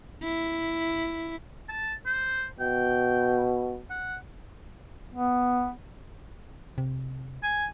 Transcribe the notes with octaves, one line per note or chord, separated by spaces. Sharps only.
E4
A5
C5
B2 G5
F#5
B3
C3
G#5